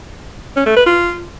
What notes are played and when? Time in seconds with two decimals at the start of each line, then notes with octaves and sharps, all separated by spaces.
0.56 C#4
0.66 A3
0.76 B4
0.86 F4